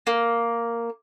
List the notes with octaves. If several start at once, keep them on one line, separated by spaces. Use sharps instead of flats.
A#3